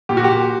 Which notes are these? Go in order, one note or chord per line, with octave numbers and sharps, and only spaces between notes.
A#2 G4
F#4
G4